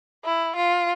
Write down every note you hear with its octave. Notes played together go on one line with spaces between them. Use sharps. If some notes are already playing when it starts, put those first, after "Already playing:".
E4
F4